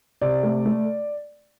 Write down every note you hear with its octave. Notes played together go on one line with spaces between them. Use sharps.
C3 D5
A3
A3